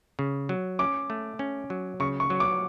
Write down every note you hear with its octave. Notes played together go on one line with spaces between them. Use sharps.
C#3
F#3
C#4 D6
A3
C#4
F#3
C#3 C#6
C#6
F#3
D6